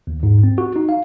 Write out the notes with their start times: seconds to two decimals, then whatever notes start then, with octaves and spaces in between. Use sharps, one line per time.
0.07 D#2
0.23 G#2
0.43 C4
0.58 F#4
0.76 D#4
0.89 F5